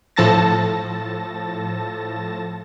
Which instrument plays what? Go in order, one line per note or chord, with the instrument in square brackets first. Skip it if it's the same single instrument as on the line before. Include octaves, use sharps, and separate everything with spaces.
[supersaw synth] A2 F3 A4 A5 A6 A#6